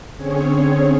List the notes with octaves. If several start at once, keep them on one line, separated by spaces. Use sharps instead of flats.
D3 C4 C#4 G#4 C#5